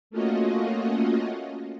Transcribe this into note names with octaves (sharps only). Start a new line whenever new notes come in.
A3 A#3 C#4 F4 F#4 D#5